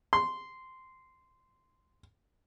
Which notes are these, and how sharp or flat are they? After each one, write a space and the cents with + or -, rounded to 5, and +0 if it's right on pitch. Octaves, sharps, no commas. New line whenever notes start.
C6 -10